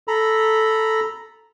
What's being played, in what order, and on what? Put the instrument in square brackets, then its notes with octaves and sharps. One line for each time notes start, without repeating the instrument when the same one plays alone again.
[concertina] A4 A#5 B5